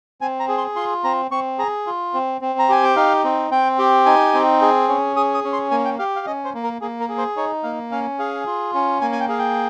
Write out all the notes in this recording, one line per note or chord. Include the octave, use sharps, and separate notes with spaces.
C4 G#5
A#5
G#4
C6
F4 C6
C4 A#5
C4 C#6
G#4 A#5
F4
C4
C4
A#5
G4 G#5
G5
D#4 F5
C4
C4 G5
G4
D#4 G#5
C4
G#4
C#4
G#4 D#6
D#6
C#4
C6
A#3 G#5
G5
G4 F5
F5
C#4 D#5
C5
A#3
A#4
A#3 G#4
A#4
G#4
C5
D#4 C#5
A#3 F5
C#4 F5
G#4 F5
F4
C#4
A#3 G#5
G#5
G5
G#4 F5
G5